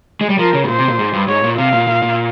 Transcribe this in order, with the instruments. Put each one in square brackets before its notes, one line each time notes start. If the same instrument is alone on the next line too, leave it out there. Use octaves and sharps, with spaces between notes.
[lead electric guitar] G#3
G3
[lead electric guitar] F3 [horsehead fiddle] A#4
[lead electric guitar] C#3
G#2
[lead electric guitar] A#2 [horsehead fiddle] C5
[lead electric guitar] C3
A#2
G#2
G2
[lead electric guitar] G#2 [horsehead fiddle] C#5
[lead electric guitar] A#2
[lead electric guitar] C3 [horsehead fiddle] F5
[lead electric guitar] A#2
A#2
A#2